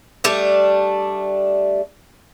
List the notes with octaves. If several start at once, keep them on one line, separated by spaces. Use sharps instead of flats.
G3 A3 D4